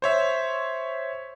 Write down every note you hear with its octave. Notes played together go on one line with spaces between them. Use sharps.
C5 C#5 E5